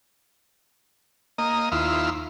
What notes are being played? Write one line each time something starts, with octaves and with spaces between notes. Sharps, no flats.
A#3 D#5
D#2 E4 F4